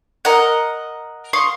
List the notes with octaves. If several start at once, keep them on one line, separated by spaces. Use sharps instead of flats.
A#4 D#5 F#5
F5 C6 C#6 D#6